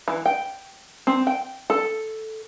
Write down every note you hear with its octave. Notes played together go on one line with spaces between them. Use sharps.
E3
G5
C4
G5
A4